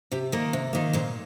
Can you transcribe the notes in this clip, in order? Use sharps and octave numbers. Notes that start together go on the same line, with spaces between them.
C3 G4
D#3 A#3 A#4
C3
D#3 A#3
A#2 C5